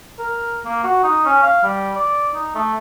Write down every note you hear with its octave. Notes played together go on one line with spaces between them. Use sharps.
A#4
A#3
F#4
D#4
C#4
F5
G3
D5
D#4
A3